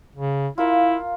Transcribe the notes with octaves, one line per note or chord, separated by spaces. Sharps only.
C#3
E4 F4 A#4 F5